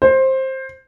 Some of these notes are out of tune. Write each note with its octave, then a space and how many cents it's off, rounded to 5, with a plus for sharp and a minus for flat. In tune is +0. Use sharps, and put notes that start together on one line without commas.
C5 +15